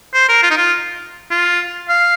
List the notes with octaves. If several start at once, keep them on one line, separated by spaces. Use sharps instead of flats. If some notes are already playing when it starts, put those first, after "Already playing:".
C5
A#4
F4
D#4
F4
F4
F5